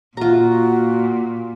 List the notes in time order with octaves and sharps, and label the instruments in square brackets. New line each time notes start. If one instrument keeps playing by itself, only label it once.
[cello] A#2 [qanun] F4 A#5 [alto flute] F#4